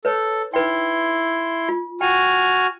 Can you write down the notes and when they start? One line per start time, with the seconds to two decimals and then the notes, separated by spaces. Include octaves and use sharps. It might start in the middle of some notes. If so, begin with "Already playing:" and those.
0.05 A4 B4 C#5
0.54 D#4 E4 B4 G5 C6
1.69 F4
2.01 F#4 G5 G#5 F6